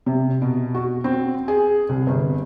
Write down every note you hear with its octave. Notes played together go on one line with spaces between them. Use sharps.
C3
B2
F#4
C4
G#4
C2
G1